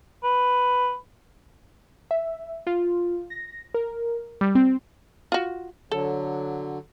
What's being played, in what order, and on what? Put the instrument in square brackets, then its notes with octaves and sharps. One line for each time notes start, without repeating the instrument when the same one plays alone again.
[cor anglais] B4
[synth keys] E5
F4
A#6
A#4
G3
C4
[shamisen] F4 F#4
[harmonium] D3 F#3 [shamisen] A4